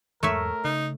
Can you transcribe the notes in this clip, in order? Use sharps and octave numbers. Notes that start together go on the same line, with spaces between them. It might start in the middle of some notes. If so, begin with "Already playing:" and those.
E2 G#2 G#3 A3 A#4 C#5 E5
C#3 D#4